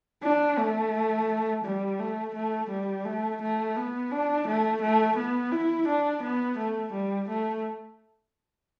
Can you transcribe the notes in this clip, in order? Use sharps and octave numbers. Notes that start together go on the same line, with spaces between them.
D4
A3
G3
A3
A3
G3
A3
A3
B3
D4
A3
A3
B3
E4
D4
B3
A3
G3
A3